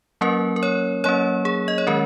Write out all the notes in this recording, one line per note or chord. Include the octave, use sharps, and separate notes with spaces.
F#3 A#3 C#4 A#4
A#4
C#5
F#3 A#3 C#4 C#5
G#4
D#5
C#5
D#3 G#3 C#4 A#4